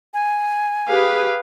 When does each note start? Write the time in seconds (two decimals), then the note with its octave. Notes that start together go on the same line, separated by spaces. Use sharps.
0.14 G#5
0.88 G4 G#4 B4 F5